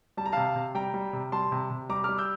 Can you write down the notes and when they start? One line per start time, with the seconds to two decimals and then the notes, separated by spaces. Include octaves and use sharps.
0.17 G3 A5
0.26 A#5
0.32 C3 F5 A5
0.56 C3
0.75 G3 G5 A#5
0.94 G3
1.13 C3
1.32 G3 A5 C6
1.52 C3
1.71 C3
1.89 G3 A#5 D6
2.04 G3 D6 F6
2.18 E6 G6